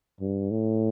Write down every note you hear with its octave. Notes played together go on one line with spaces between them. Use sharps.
G2
A2